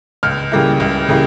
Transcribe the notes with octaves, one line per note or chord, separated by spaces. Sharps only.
C#2 F6
C#3 G3 A#3 E4
C#2
C#3 G3 A#3 E4